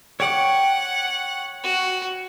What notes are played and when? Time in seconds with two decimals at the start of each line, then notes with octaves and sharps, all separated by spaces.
0.20 C#5 F#5 G5 D6
1.64 F#4